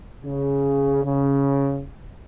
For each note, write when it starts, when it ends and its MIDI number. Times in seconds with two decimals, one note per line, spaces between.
0.24 1.04 49
1.04 1.83 49